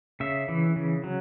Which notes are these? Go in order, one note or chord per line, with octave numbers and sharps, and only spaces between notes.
C#3 E5
E3
C#3
F#3